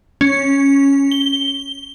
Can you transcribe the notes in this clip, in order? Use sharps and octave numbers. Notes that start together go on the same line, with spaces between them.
C#4
G7